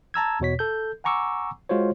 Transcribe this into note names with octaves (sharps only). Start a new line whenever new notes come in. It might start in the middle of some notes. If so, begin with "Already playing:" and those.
A5 A#5 E6 G#6
E2 B2 C#5 B6
A4 G6
F#5 G#5 A#5 C#6 D6 E6
G#3 F4 F#4 C5 C#5